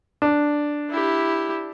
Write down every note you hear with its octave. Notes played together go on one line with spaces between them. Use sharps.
D4
E4 G4